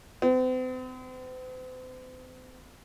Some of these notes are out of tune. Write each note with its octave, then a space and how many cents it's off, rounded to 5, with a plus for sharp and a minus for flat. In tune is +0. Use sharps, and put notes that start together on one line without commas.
C4 -40